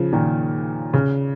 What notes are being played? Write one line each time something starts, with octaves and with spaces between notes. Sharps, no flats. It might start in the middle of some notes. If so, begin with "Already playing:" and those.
Already playing: C#3 F3
A#2 D#3
C#3